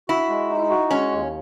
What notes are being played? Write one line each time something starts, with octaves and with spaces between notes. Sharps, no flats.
E4 F#4
G#3
D#4
F#4
G#3 C#4
D#2